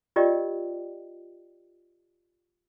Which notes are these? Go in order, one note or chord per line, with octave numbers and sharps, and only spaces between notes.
F4 G4 A#4 D5 D#5 G5